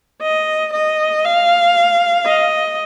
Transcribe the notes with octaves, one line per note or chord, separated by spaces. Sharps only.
D#5
D#5
F5
D#5